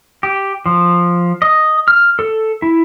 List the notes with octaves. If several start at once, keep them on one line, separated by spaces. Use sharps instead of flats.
G4
F3
D#5
F6
A4
E4